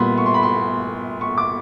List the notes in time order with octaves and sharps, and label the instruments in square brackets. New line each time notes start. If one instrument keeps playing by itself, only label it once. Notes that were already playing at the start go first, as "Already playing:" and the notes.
Already playing: [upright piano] A#2 G3 B3 B5 C6
C#6
C6
B5
C6
C#6
D6